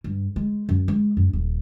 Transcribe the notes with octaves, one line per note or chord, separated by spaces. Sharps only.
G2
G#3
F#2
G#3
F#2
D#1